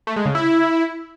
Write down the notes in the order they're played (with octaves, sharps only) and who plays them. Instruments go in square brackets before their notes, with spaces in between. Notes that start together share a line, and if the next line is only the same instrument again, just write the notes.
[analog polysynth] A3
G#3
C#3
E4